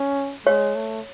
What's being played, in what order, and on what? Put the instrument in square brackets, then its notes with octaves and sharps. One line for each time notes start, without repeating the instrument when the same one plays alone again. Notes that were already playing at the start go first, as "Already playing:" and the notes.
Already playing: [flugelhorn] C#4
[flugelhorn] G#3 [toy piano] C#5
[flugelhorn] A3